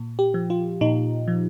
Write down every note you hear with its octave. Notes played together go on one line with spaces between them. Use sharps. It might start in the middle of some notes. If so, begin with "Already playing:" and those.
Already playing: A#2
G4
F3
F4
A#2 D#4
F3